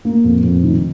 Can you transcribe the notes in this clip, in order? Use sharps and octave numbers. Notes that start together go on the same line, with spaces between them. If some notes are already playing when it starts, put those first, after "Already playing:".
A#3
F2
F2
D#3